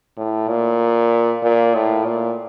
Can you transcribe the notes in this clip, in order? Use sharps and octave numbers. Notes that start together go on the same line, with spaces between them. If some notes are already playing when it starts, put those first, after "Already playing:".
A2
A#2
A#2
A2
A#2